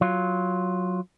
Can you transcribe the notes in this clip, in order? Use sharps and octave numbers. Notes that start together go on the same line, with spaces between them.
F#3 F4